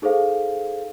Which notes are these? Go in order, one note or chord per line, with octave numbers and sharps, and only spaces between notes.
D#4 G#4 A4 C5 F5